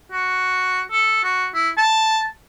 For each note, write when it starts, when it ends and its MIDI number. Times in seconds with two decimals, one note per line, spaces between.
0.12 0.81 66
0.92 1.20 69
1.24 1.47 66
1.54 1.69 64
1.78 2.26 81